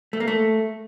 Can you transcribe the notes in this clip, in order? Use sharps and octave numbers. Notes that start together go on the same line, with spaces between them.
A3
A#3
A3